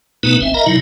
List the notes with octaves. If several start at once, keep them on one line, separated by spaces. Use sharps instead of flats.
B2 A3 B3 D#4 B4
G#1 C4 E5
A#4 D#5 E5 A#5
C3 F#3 D#4 E4